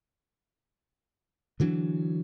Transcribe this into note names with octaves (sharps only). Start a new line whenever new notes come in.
D3 E3 F#3 D4